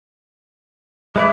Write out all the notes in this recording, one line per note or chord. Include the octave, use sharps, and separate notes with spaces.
G#3 B4 D5 E5